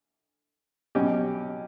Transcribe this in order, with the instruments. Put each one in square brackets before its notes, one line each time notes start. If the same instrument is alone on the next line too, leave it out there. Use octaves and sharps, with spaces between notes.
[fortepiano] B2 F#3 C#4 G4